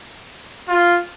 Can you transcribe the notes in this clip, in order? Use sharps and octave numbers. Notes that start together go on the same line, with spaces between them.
F4